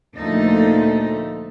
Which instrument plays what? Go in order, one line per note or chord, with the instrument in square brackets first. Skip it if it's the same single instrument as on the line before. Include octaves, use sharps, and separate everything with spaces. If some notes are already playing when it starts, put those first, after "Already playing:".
[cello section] D2 A#2 F3 A3 D#4 A4